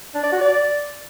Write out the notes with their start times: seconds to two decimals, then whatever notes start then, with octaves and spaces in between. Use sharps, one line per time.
0.14 D4
0.23 D5
0.32 F#4
0.41 D5